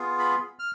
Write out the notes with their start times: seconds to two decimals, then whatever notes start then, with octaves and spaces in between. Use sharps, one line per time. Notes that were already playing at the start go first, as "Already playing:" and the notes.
Already playing: B3 F4 G#4
0.19 B5
0.59 F6